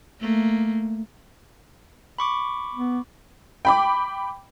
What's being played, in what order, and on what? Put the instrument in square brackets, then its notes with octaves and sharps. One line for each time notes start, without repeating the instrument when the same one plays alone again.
[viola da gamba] A3 A#3
[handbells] B5 C#6 D6
[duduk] B3
[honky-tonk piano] G5 B5 D6